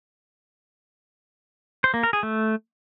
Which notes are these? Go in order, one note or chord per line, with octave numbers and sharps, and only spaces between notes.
C5
A#3
A#4
G#4
A3